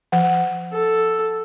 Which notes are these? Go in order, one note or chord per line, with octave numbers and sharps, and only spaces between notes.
F3 F#5
A4